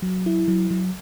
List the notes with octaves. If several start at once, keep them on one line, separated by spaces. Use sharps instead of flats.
F#3
E4
F#3
F#3